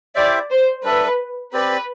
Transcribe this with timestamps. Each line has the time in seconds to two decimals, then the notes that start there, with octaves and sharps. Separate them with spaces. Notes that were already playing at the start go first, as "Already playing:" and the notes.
0.15 E4 G4 C5 D5 E5
0.50 C5
0.84 G3 D4 A4 B4 E5
1.53 C4 G4 B4 D5